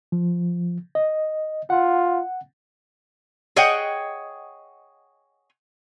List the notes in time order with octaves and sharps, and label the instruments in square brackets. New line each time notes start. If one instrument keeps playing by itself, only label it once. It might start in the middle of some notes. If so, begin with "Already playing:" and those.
[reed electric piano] F3
D#5
[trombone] F4 [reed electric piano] F#5
[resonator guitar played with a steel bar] G#4 C#5 D#5 F#5 G5